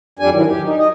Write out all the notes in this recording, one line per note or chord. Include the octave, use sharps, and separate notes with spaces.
F2 G3 D4 G#5
G#2 D#3 E3 F#3
G4
D#4
D#5